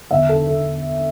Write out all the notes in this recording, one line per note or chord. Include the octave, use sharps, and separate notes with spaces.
E2 D3 B3 E5
A4
A4